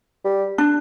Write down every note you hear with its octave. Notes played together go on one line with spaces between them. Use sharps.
G3
D4